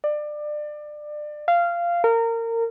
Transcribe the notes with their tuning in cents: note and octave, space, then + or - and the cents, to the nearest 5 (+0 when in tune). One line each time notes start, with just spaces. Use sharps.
D5 +25
F5 -15
A#4 -25